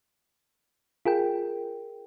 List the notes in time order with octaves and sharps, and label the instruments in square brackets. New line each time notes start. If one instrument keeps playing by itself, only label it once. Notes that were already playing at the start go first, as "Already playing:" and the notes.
[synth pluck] F4 G#4 A#4 G5